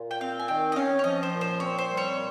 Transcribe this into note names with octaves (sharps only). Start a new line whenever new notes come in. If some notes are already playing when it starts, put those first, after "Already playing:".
Already playing: A#2
G5
C4 F5
G#5
D#3 G5
D#5
C#4 F5
C#5
F3 D#5
C5
A#2
C5
C4 C#5
C5
G3
C#5
A#2